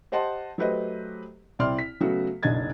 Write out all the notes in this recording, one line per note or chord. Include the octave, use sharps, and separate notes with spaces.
G4 C5 D#5 F#5 A5 C6
F#3 A3 G4 B4 C5 D#5
C2 C4 E4 D5 C6 F6
B6
C#3 F#3 A3 B3 F#4
F#1 B1 D4 D#5 G#6 A6